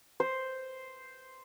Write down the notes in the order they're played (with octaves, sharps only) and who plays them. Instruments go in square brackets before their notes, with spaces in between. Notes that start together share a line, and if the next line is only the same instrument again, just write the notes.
[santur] C5